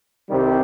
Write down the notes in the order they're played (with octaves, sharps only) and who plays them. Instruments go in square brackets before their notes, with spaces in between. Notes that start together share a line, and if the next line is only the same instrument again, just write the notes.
[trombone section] C2 C3 D#3 G3 C4